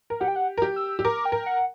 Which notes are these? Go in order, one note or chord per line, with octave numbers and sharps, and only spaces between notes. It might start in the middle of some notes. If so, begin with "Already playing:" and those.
A#4
G4 F#5
G5
F#5
A#4
G4
E6
G4
A#4 D6
G5
A#4
F#5